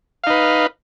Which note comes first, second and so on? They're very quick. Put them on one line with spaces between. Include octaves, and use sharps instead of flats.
F5 D#4 B4